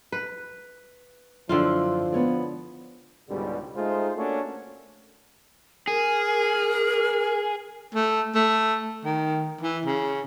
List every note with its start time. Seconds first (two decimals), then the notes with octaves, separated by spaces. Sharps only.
0.12 B4
1.49 F#2 D3 F3 E4 F4
2.12 B3 C#5 D5
3.29 C#2 G#2 B2 D3 G3
3.76 G#3 A3 D#4 F4 C5
4.17 A3 A#3 C#4 D4 F#4 A4
5.87 G#4 A#4
7.95 A3
8.35 A3
9.04 D#3
9.61 E3
9.86 C#3